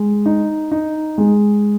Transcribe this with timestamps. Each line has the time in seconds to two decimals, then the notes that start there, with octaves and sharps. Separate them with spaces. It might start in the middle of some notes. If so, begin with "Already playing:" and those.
Already playing: G#3
0.26 D#4
0.71 D#4
1.18 G#3